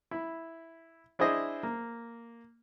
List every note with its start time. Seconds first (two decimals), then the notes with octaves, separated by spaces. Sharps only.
0.11 E4 B5
1.19 D4 E4 G#4 C5 D#5
1.63 A#3